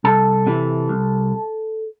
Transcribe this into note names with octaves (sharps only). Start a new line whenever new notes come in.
C2 A4
C3 E3
C2